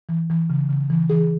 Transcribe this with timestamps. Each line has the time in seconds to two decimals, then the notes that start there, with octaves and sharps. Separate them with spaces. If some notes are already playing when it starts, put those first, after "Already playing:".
0.09 E3
0.30 E3
0.50 C#3
0.69 C#3
0.90 E3
1.10 E3 G#4